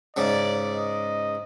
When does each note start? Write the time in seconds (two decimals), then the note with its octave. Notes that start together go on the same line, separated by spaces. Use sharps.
0.17 G#2 C#3 D5
0.74 D#5